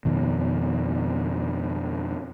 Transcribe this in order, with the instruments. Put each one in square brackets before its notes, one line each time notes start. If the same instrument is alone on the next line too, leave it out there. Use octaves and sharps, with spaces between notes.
[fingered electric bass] F2 B2 D#3